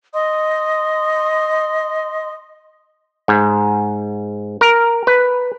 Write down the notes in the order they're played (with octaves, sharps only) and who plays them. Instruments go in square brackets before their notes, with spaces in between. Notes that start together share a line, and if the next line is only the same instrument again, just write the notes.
[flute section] D#5 C6 D#6
[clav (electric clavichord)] G#2
A#4
B4